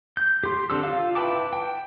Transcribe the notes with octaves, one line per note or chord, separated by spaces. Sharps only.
G6
G4 C6
D3 C4 D4 A4 E6
F4 F5
E4 B4 G5 A5 D6
G5